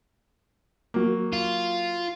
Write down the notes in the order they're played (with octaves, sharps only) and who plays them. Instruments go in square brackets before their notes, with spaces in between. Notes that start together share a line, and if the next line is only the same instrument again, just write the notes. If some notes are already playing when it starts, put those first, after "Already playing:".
[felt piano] F#3 A#3
[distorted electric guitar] F4